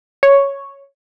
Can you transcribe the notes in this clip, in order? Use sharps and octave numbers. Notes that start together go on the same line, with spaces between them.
C#5